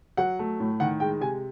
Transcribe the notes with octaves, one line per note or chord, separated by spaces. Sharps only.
F#3 F#5
A3
A2
D#3 F#5
G#3 G5
C3 G#5